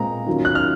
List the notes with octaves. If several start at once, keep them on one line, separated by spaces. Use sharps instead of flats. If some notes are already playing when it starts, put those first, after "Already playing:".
Already playing: A#2 G#3 C4 A#5
D#3 F#3 C#4 F4
F#6
F6